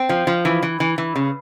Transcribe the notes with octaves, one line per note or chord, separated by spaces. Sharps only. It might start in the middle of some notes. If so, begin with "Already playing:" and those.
Already playing: C4
F3
F3
E3
E3
E3
E3
C#3